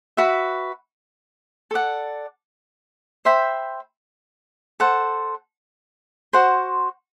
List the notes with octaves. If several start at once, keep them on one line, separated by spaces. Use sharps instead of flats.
F#4 B4 E5 B5
A4 D5 F#5
C5 E5 G5 B5
A4 C5 F#5 A5
F#4 C5 F#5 C6